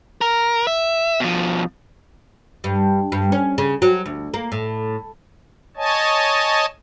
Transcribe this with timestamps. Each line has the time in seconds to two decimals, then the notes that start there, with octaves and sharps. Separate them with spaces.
0.21 A#4
0.67 E5
1.20 B2 F3
2.64 G2
3.12 G2
3.32 C#4
3.58 C#3
3.82 F#3
4.06 D2
4.34 A#3
4.52 A2
5.77 C#5 D#5 G#5 A5